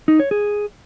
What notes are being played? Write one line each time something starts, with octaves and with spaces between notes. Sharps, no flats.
D#4
C#5
G#4